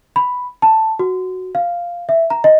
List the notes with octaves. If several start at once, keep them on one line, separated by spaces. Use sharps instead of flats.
B5
A5
F#4
F5
E5
A#5
D#5